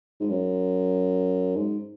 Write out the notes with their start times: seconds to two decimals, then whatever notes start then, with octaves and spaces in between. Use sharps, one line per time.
0.21 G#2
0.30 F#2
1.56 G#2